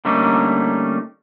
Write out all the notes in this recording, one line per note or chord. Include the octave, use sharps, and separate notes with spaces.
D3 G3 A3 A#3 C#4 D#4